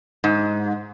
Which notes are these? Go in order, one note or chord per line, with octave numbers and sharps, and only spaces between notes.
G#2